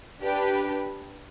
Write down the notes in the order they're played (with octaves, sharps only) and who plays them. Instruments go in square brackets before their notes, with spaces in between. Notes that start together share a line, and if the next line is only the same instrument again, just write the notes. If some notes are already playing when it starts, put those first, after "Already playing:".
[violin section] D4 G4 B4